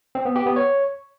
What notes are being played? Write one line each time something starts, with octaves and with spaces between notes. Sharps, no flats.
C4
B3
G4
B3
C#5